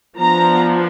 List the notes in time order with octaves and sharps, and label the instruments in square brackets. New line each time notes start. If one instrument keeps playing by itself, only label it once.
[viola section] F3 B3 D4 A#5